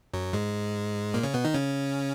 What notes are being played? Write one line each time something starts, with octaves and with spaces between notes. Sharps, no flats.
F#2 F#3
G#2 G#3
A#2 A#3
C#3 C#4
B2 B3
D#3 D#4
C#3 C#4